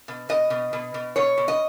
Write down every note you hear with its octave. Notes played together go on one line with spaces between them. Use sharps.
B2
B2 D#5
B2
B2
B2
B2 C#5
B2
D#5